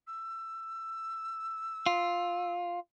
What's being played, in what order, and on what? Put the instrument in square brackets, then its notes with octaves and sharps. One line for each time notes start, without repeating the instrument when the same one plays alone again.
[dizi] E6
[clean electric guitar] F4